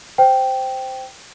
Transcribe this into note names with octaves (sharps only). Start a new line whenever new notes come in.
C5 G5